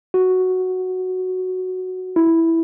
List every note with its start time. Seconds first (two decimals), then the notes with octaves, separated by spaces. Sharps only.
0.14 F#4
2.16 E4